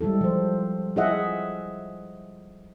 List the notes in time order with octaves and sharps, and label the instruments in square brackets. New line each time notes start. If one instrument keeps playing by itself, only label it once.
[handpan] G3 G#3 E4 A4
F3 C5
E4 F4 G#4 D#5 E5 F#5